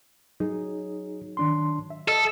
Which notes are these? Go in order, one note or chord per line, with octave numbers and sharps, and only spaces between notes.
F#3 D#4 G#4
D#3 D4 C6
E5
A4 D#5